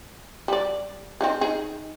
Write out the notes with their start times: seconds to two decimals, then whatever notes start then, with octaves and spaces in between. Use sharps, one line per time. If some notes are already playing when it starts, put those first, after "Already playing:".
0.48 G3 D5
1.21 C4 D#4 G#4
1.41 D#4 G#4